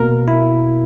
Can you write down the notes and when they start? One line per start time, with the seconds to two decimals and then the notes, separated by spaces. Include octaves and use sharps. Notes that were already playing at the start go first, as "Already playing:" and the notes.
Already playing: B2 A#3 A#4
0.28 E4